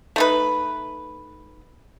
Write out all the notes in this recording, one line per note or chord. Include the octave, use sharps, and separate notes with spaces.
A3 D#4 B4